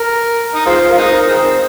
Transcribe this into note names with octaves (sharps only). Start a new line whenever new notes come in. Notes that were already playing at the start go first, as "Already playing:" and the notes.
Already playing: A#4
D#4
G#3 C4 F4 C5
F4 A#4
G#3 C4 D#4
A#4
D#3 G#3 C4